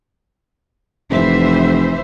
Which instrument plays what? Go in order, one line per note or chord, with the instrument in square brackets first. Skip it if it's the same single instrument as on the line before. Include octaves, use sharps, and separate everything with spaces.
[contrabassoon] F1 [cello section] E3 C5 E5